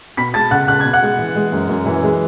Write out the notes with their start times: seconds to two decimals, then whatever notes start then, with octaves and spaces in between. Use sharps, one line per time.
0.17 B2 B5 B6
0.34 G#3 A5 A6
0.51 C#2 F#5 F#6
0.68 C#2 F#6
0.80 B2 G#6
0.93 F#5 F#6
1.02 G#3
1.18 E3
1.35 G#3
1.52 F#2
1.69 F#2
1.86 E3
2.03 G#3